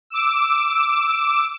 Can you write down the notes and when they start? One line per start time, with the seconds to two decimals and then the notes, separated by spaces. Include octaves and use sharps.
0.10 D6 E6